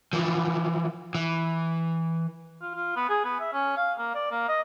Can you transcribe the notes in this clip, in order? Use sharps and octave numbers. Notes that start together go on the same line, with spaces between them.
E3 F3
E3
F4
F4
B3
G#4
B3
E5
C#4
F5
A#3
D5
A#3
D#5